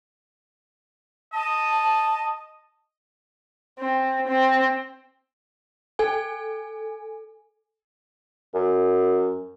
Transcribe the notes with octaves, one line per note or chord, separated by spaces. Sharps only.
D#5 A5
C4
C4
A4 G#5
F#2